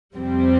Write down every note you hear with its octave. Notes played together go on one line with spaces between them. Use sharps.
F2 C3 G3 C4